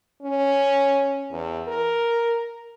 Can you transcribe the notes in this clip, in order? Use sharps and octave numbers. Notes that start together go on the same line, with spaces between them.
C#4
E2
A#4